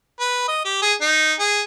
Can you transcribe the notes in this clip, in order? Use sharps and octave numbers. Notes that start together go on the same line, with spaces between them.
B4
D#5
G4
G#4
D#4
G#4